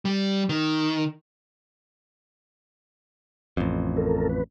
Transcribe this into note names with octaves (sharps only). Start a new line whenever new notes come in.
G3
D#3
A1 F2
A4 A#4
B4